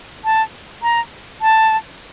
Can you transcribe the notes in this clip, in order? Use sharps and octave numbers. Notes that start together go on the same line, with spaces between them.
A5
A#5
A5